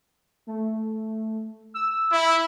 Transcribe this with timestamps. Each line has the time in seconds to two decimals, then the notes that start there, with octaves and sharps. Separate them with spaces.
0.47 A3
1.74 E6
2.12 E4